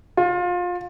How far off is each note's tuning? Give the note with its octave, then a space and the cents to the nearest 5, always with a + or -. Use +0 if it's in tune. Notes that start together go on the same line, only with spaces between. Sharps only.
F4 +25